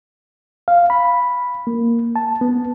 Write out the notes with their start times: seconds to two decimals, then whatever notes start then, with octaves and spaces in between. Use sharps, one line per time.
0.68 F5
0.90 B5
1.67 A#3
2.16 A5
2.41 B3